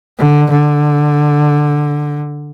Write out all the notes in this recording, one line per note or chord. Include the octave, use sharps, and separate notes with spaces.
D3
D3